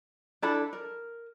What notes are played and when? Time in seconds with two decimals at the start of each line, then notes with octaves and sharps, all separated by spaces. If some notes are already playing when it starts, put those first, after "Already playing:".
0.42 D4 E4 A4 B5
0.73 A#4